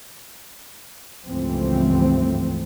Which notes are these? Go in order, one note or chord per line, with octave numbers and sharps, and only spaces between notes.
C#2 G2 E3 F3 A3 C4